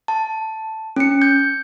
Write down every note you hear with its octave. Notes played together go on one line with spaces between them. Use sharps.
A5
C#4 C#7
G6